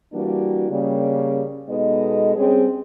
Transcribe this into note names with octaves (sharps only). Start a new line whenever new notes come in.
E3 G3 A#3 D4 E4 F#4
C#3 G3 A#3
B2 G#3 B3 D#4 A4 D#5
G3 C4 C#4 G#4